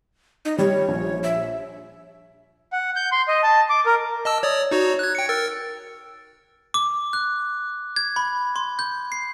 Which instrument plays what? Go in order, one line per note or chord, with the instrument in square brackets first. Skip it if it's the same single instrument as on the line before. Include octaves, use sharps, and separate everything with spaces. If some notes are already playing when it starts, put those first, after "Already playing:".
[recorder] D#4
[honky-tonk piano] G3 [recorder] C#5
[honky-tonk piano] A#1
[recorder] E5
[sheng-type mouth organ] F#5
G6
C6
D#5
A5
D6
A#4
[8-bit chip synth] D#5 A5 E6
C#5 D5 D#6
D#4 F#4 C#5
F#6 G#6
G5 C#7
A#4 E6 A6
[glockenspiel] D6
F#6
G#6
B5
C6
G6
C7